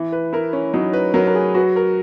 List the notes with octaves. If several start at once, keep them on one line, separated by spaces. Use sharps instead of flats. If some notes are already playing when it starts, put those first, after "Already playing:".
Already playing: E3
B4
E4 A#4
C#4
F#3 D#4
B4
F#3 A#4
A#4
G#4
F#4 B4
A#4